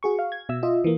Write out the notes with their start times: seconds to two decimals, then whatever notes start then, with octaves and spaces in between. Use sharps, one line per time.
0.03 F#4 G#4 C#6
0.19 F5
0.32 G#6
0.49 B2 E5 E6
0.63 F4 D#5 E5
0.84 E3 A#3